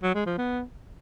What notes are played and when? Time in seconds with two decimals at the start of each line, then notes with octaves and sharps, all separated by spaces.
0.03 F#3
0.15 G#3
0.26 F3
0.38 B3